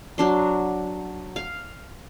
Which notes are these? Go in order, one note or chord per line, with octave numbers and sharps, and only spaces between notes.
F#3 D4 C6
F5